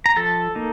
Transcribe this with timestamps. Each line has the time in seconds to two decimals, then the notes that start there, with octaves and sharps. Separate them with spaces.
0.06 A#5
0.16 F3 A4 A5
0.55 A#3 D#4